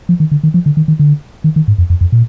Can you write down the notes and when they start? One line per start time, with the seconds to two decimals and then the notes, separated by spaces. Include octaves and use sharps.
0.09 F3
0.20 D#3
0.31 D3
0.43 D#3
0.54 F3
0.66 D3
0.77 D#3
0.88 D#3
0.99 D3
1.44 D#3
1.56 D#3
1.68 G#2
1.78 F2
1.90 F2
2.01 F2
2.12 A#2